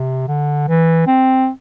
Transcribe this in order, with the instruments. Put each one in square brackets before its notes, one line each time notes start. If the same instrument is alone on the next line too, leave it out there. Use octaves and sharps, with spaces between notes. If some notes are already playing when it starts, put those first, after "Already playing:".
Already playing: [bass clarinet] C3
D3
E3
C4